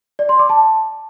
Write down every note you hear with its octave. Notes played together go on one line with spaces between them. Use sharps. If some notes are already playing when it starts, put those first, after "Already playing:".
D5
C6
D6
A5